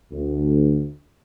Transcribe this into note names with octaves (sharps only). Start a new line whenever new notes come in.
D2